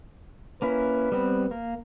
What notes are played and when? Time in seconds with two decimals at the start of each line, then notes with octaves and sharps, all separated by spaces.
0.62 A#3 C#4 E4 B4
1.12 G3 B3 C4
1.51 A#3